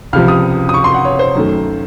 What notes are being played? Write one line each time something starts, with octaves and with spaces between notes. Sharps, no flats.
C#2 C3 F3 F6
D#6
D#6
C#6
C6
F#5
C#5
C5
F#2 D#3 A3